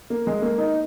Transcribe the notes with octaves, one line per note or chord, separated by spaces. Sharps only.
A#3
G#3
A#3
D#4